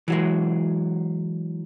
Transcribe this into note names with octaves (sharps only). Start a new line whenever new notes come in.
E3 F#3 G#3